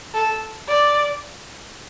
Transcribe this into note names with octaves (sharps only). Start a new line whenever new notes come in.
A4
D5